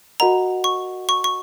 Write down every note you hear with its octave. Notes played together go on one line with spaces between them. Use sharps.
F#4 A#4 D#5 F#5 A#5
C#6
C#6
C#6